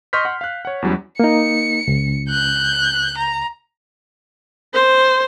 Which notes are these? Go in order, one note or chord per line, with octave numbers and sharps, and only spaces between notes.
D#5 C6 C#6 F6 G6 B6
F#5 C6
F5 F#6
C#5 F#5
E2 E3 F#3 G3 C#4
A#3 D#4 C#7
C#2
F#6 G6
A#5
C5